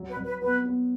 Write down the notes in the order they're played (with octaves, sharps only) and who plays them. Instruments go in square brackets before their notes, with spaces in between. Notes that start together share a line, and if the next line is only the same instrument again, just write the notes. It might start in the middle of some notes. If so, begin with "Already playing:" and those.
Already playing: [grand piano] F#3
[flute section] B4
[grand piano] F#3
[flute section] B4
[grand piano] B3 [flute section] B4
[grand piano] B3